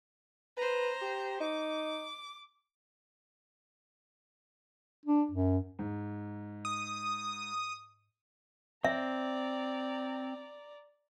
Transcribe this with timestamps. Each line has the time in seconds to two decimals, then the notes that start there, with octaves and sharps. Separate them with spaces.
0.57 B4 C5 A#5
1.01 G4
1.41 D#4 D6
5.06 D4
5.31 F#2
5.79 G#2
6.65 D#6
8.84 C4 D5 E5 A#5